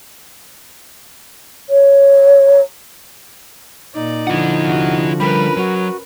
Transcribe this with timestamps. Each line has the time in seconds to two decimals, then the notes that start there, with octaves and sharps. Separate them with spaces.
1.70 C#5
3.95 A#2 D#4 D5
4.27 D3 F3 E4 F#5
4.62 C3 F#4
5.20 G3 C#4 A#4 B4 B5
5.57 F#3 F#4